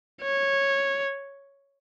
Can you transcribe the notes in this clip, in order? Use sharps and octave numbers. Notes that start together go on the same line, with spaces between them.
C#5